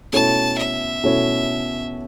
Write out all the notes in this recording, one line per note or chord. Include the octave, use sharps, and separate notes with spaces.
B2 A3 C#4 E4 C#5 A5
E5
B2 A3 C#4 E4 C#5